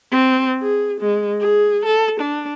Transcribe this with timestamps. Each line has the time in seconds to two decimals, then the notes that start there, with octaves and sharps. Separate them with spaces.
0.12 C4
0.62 G#4
1.01 G#3
1.41 G#4
1.85 A4
2.20 D4